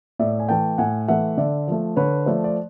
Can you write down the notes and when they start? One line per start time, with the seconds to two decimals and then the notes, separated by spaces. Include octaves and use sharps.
0.19 A2 D5 E5
0.40 G#5
0.49 E3 A3 G5 A5
0.78 A2 F#5 G#5
1.08 E3 A3 E5 F#5
1.37 D3 D5 E5
1.68 F3 A3
1.96 D3 B4 C#5
2.26 F3 A3 C5 D5
2.44 D5